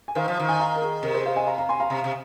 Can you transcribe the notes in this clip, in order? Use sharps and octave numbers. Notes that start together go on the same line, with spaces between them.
G#5
D#3 C5 F5
F3
D#3
G#5
F5 A#5
A#4
G#4
C3 A#4
G#4 C5
C5 F5
D#5 G#5
F5 A#5
F5 A#5
G#5 C6
F5 A#5
C3 F5 A#5
C3